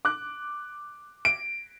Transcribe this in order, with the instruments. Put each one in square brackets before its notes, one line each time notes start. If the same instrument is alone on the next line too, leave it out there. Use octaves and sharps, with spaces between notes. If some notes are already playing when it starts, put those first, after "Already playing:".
[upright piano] D6 F#6
[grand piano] D7